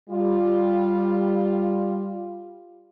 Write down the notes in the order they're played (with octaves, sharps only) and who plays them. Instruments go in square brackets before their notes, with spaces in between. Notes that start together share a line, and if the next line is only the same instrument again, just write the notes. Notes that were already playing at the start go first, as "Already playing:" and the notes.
[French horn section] G3 F4